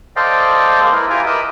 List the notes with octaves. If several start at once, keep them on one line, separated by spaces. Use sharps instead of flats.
A4 C5 D5 D#5 F5 G5
G#3 A#3
E4 A#4 B4
E4 F4 G4 G#5 A#5 D6
A#4 B4 D#5 E5 D6 D#6